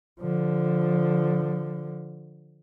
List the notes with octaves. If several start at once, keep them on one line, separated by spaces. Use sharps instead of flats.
D3 F3